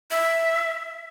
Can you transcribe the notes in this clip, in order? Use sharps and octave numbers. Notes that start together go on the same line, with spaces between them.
E5